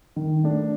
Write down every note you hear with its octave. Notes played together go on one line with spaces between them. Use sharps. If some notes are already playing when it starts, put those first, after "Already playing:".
D#3
A3 D4